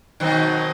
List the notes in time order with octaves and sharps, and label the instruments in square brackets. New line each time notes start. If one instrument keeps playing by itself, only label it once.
[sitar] B2 D#3 [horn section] F#3 C4 D#4